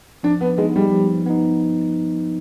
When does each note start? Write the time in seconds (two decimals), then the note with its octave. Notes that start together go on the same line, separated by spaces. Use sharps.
0.23 F3 D4
0.41 B3
0.57 G#3 B3 D#4
0.76 G3
0.92 F3
1.26 B3 D#4